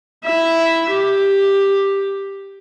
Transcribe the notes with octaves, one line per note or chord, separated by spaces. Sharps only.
E4 E5
G4